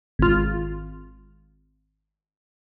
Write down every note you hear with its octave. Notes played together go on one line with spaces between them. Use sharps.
G#1 F4